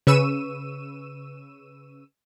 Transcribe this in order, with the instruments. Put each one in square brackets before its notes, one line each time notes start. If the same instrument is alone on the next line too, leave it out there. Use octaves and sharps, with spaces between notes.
[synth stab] C#3 B4 C#6 E6 D#7 E7